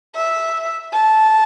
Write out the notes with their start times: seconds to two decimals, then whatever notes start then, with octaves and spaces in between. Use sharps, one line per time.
0.15 E5
0.92 A5